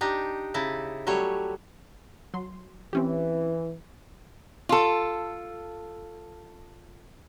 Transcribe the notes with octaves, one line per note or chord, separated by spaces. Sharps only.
D4 D#4 G4
C#3 D#4 E4 A5
F#3 G3 A3 C#5
F#3 C6
E3 C4 C#4 G4
F4 A4